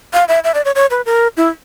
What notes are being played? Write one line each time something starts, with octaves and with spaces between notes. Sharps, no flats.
F5
E5
E5
D5
C#5
C#5
B4
A#4
E4